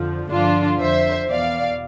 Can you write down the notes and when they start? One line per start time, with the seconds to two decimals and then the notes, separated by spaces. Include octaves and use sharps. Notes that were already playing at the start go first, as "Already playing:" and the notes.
Already playing: F2 D3 F3
0.30 G2 D3 F3 D4 F4
0.80 F2 D3 F3 C5 E5
1.29 E2 B2 D5 F5